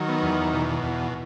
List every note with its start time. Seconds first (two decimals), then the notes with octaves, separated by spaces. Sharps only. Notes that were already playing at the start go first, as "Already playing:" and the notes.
Already playing: D#3 F#3
0.09 B3
0.22 E2
0.53 B2
0.82 E2